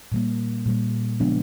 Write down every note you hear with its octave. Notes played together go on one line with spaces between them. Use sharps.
A#2 G3 A#3
A#2 G3 A#3
C#3 F3 G#3 B3 D4